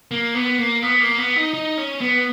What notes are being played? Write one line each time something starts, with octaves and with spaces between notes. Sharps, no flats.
A#3
B3
A#3
B3
A#3
B3
D#4
D#4
C#4
B3